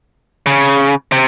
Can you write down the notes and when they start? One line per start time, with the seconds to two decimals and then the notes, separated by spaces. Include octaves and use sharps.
0.46 C#3
1.12 C3